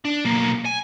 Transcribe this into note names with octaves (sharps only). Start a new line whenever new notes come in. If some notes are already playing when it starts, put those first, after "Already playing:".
D4
B1 A#3
G#5